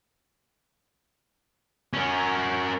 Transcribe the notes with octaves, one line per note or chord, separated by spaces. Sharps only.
C#4 A#4